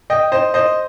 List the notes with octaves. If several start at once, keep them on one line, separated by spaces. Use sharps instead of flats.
D#5 G5
C5 D#5
C5 D#5